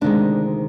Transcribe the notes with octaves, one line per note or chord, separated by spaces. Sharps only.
D2 C3 D#3 G#3 D4